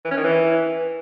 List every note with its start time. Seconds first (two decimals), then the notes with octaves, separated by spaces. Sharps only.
0.04 E3
0.11 C#4
0.17 D#3
0.24 E3